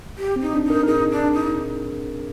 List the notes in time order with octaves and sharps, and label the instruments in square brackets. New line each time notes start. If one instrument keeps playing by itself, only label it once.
[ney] G4
[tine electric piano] C4
[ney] D#4
[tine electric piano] D4
[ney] D#4 [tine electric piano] A#4
[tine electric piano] A#4
[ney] D#4 [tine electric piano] G#4
[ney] D4
D#4